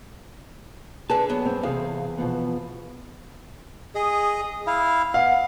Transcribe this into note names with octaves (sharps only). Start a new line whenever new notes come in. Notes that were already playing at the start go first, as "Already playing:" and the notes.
D3 G#4 B4 A5
F#3 B3
G2 C4
E2 C3 G#4 F5
B2 F3 B3
G#4 D#5
E4 F5
B3 F5